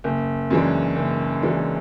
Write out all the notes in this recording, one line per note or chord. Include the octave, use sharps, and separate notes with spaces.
F#1
F#2 E3 G#3 D4
F#1
F#2 E3 G#3 D4